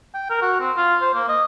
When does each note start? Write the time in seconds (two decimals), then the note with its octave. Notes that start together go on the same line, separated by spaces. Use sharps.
0.14 G5
0.30 A#4
0.42 F#4
0.60 C4
0.77 F4
1.01 C5
1.14 A#3
1.29 D#5